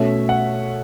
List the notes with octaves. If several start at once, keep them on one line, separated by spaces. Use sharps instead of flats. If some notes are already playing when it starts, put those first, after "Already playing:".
Already playing: B2 A3 C#4 E5
F#5